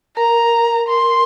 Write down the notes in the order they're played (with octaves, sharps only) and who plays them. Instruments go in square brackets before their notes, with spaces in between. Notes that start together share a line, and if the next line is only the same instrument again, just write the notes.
[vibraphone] A#4 [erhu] A#5
[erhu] C6